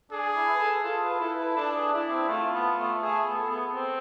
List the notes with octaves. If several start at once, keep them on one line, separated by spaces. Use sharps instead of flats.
D4 G#4
E4
B4
A4
F4 A4
B4
E4 A4
B4
D4 A4
G#4
D4 E4
C4
A3 F4
B3
A3
A3 G#4
B3
A4
B3
C4